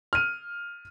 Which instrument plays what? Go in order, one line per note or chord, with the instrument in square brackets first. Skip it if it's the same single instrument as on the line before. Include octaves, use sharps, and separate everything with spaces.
[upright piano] F6 D#7